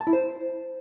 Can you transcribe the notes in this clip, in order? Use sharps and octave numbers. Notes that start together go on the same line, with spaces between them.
A5
E4
C5